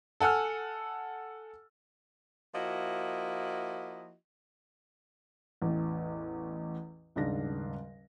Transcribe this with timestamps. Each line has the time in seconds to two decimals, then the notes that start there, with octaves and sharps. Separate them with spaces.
0.20 A4 F#5 G#5 E6 F6
2.54 F3 A#3 E4 F#4 D#5
5.62 A1 E2 A2
7.16 D#1 G#2 C#3 D4 A#6